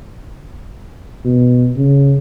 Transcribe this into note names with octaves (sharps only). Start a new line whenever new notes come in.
B2
C#3